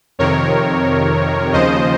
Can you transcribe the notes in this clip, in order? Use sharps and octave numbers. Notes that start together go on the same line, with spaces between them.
F2 C3 D#3 A#4 C#5
D#2 C#3 F3 C5 D#5